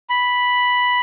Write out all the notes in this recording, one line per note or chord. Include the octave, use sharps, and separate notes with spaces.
B5